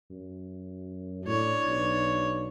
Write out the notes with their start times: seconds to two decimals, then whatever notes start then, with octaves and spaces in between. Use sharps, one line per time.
0.11 F#2
1.26 A2 D4 C#5
1.65 B1